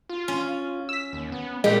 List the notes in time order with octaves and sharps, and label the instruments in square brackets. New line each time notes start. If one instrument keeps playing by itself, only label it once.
[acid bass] F4
[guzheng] C#4
[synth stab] E6 B6
[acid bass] D#2
B3
[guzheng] A#2 G4 [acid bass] G3 [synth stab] G#3